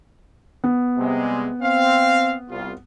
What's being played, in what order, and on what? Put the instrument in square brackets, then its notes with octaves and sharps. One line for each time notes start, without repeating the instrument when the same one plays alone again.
[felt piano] B3
[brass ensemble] C3 G3 G#3
C4 F5
C2 F4